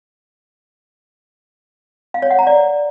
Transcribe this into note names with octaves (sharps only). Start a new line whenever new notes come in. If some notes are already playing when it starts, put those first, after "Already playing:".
F5
C#5
F#5
A#5
D5